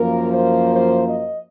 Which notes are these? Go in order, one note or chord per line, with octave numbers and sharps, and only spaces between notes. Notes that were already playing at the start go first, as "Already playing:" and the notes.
Already playing: F#2 F3 A#3 A#4
C5
C5
D#5